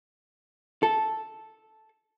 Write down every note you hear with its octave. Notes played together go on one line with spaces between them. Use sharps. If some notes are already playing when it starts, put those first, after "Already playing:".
A4